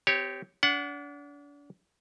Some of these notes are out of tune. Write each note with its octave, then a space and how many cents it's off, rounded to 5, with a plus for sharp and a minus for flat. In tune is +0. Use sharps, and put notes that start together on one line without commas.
C4 -45 G4 -5 C#5 +0
D4 -35 F#5 +0